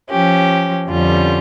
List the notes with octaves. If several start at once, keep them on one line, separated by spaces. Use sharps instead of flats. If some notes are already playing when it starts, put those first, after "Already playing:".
F3 C#4 G4
F2 D3 G3 C#4 F4